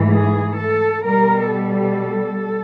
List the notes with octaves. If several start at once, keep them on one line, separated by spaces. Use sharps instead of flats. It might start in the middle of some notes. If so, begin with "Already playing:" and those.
Already playing: G#2 E3 A3
G#4
A4
B2 G3 A#4
A4